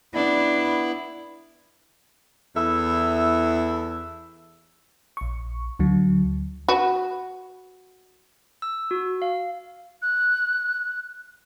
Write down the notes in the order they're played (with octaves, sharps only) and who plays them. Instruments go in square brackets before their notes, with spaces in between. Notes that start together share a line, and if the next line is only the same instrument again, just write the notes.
[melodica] B3 E4 [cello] D4
[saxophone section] E2 E4 A4 E5
[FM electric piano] A#1 C#6
D2 D3 F#3
[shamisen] F#4 B4
[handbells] E6
F#4
F5
[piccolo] F#6